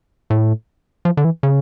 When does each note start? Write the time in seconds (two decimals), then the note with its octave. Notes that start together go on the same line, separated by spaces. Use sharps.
0.30 A2
1.05 F3
1.17 D3
1.24 E3
1.43 C#3